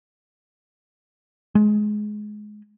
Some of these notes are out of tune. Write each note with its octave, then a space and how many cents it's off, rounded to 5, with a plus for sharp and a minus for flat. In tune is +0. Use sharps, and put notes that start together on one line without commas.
G#3 +20